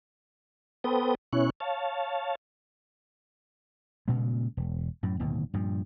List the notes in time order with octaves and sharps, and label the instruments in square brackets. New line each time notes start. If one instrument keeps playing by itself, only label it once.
[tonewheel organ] B3 A4 B4 C5 G5 D#6
B2 C#4 E4 C#5 F#6
C#5 F5 A5
[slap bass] G2 A#2 C#3 G#3
E1
F#2 A2
D1 D#2 B2
G2 A#2 F3